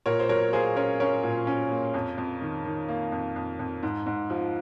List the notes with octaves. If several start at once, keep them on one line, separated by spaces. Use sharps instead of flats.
A#2 A#4 C#5
C5
F#3 A#4 C#5
A#3 G#4 C5
C#4 A#4 C#5
C#4 A#4 C#5
A#2
C#4
A#3
F2
F2
D#3
D#3
A#3
F2
F2
F2
G#2
G#2
F3